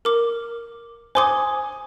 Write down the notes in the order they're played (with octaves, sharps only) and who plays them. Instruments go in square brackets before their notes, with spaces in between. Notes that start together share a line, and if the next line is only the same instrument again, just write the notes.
[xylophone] A#4 D6
[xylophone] C5 C6 D6 [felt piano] G#5 D#6